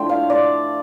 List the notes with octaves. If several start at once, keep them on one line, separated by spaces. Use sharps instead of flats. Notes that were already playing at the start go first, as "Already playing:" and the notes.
Already playing: A2 F3 A3 D4 G5 C6
F5
D5